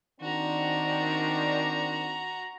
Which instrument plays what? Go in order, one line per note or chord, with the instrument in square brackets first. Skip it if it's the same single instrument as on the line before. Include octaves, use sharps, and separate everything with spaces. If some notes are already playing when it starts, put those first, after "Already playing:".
[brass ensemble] D#3 C4 D4 [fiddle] F#4 A#5